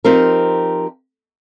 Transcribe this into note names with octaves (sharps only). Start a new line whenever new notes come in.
F3 C4 D#4 G4 A#4